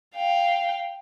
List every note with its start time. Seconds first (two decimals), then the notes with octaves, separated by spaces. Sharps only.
0.16 F5 G5